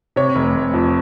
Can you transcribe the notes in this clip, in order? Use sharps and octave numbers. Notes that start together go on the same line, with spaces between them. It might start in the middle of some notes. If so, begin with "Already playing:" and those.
C3 C#5
F1
F1
F2